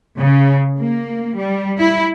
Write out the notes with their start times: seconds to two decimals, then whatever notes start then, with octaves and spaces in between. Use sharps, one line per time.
0.18 C#3
0.78 A#3
1.36 G3
1.80 E4